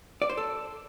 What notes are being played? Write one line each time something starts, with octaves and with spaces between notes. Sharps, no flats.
D5
C5
A4